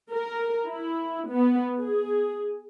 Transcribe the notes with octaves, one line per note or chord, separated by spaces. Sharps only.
A#4
E4
B3
G#4